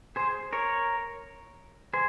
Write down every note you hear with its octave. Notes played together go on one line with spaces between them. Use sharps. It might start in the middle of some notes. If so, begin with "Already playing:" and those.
G#4 C5
A#4 C#5
G#4 C5